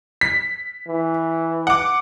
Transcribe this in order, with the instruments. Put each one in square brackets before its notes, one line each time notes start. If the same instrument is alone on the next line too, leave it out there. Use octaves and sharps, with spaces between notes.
[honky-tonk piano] B6
[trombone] E3
[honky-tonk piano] F#5 D6